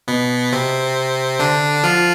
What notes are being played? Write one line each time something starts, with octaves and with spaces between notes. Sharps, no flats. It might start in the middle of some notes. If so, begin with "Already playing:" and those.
B2 B3
C3 C4
D3 D4
F3 F4